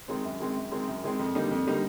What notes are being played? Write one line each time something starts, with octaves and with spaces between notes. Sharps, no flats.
D#3 G#3 C4
F#2
D#3 G#3 C4
F#2
D#3 G#3 C4
F#2
D#3 G#3 C4
F2
D3 G3 A#3 D#4
F2
D3 G3 A#3 D#4